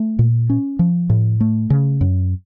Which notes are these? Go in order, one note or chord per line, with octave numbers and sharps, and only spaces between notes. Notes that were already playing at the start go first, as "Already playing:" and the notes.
Already playing: A3
A#2
C#4
F3
A2
A3
C#3
F#2